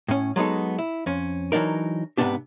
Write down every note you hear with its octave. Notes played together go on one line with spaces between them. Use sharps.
A2 C#4
F#3 G#3 B3 D#4 A4
E4
F2 C#4
E3 F#3 D4 D#4 A#4
G#2 C3 B3 C#4 D4 G4